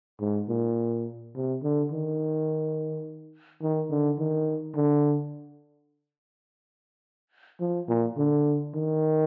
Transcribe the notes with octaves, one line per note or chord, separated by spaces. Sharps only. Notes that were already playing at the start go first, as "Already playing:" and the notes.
G#2
A#2
C3
D3
D#3
D#3
D3
D#3
D3
F3
A#2
D3
D#3